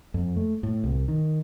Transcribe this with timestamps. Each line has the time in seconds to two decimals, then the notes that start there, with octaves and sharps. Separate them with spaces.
0.14 F2
0.36 A3
0.63 A2
0.84 C2
1.08 D#3